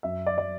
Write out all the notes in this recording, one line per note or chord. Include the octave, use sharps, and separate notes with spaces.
F#2 E5
D5
F#3 D5